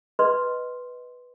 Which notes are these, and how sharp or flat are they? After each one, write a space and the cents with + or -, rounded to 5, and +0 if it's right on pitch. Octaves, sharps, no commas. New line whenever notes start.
B4 +0 D#5 +0 C6 +0